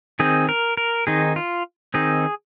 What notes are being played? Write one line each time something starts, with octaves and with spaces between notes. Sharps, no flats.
D#3 C4 D#4 G#4
A#4
A#4
D#3 C4 D#4 G#4
F4
D#3 C4 D#4 G#4